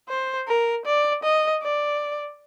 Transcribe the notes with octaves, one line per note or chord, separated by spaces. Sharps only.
C5
A#4
D5
D#5
D5